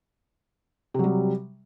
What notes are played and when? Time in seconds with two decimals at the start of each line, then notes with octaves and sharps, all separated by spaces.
0.94 C3
0.99 F#3
1.04 G3